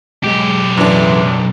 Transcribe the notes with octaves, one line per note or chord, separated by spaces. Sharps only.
B1 G#3 G4
F#2 A2 C#3 E3 D4